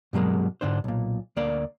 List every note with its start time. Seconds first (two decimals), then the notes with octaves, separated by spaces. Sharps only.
0.13 G2 B2 F#3 G#3 A#3
0.61 G#2 D3 D4 C5
0.84 B1 A#2
1.36 D2 A#3 D5